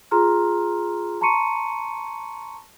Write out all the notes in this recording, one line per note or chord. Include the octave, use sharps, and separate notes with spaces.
F4 G#4 A#5 C6 F6
A5 A#5 C6 C#6 C#7 D#7